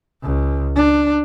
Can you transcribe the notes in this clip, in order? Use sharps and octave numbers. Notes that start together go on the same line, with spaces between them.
C#2
D4